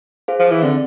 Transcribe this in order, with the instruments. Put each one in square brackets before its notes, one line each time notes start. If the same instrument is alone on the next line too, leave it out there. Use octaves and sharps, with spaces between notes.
[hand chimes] G#4 C5 F5
[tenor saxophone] F3
E3
[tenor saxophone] D3 [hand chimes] C4